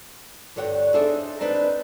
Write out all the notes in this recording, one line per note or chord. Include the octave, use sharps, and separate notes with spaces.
G2 D3 F#4 C#5 F#5 G5
D4 D#4 G#4 A4 C5 E5
C4 D4 D#4 B4